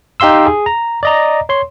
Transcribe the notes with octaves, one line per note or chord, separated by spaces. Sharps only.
D#4 G4 F5 C6 E6
G#4
A#5
D5 D#5 A#5
C#5 C6